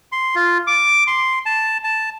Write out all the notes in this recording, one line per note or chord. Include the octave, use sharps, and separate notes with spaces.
C6
F4
D6
C6
A5
A5